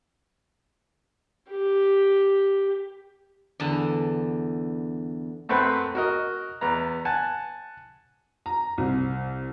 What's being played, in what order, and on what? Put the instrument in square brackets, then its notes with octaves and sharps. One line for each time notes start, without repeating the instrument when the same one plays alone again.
[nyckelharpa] G4
[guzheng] E2 D3 A5
[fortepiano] F#2 A3 C4 B4 F#5
F#4 A#4 D#5
E2 B3 A#5
F#5 G#5 A5
[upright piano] A#5
C2